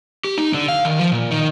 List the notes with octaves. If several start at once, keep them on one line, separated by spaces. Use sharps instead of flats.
G4
D#4
D3
F5
D#3
F3
A#2
D#3